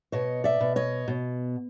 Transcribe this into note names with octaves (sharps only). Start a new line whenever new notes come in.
B2 C#5 D#5
D5 E5
B2
C#5 D#5
B2